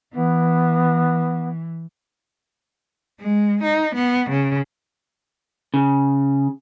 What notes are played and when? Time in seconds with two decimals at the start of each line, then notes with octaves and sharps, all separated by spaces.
0.13 E3 B3
3.20 G#3
3.63 D#4
3.95 B3
4.29 C#3
5.74 C#3